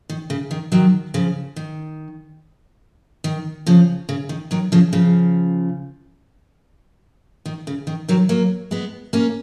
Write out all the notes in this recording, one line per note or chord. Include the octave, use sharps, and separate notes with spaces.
D#3
C#3
D#3
D#3 F#3
C#3 F3
D#3
D#3
C#3 F3
C#3
D#3
D#3 F#3
C#3 F3
C#3 F3
D#3
C#3
D#3
D#3 F#3
F#3 A#3
G#3 B3
A#3 C#4